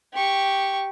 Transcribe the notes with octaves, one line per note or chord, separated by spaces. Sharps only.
G4 C#6